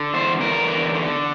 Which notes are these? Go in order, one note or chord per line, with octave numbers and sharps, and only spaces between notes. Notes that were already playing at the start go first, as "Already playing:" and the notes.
Already playing: D3
E2 C5
E2 A#4
D3
D3